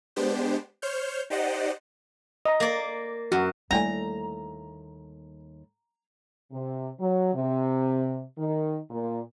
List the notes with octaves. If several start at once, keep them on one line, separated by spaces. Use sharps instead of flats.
G#3 B3 D4 G4 C5
C5 C#5 F6 G6
D#4 G4 C5 D5 D#5 F#5
D#5 A#5
A#3 D5
F#2 F#4
D#2 D3 G3 A3 E4 G5 G#5 A#5
C3
F#3
C3
D#3
A#2